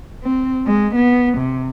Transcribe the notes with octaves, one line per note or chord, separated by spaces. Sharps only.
C4
G#3
B3
C3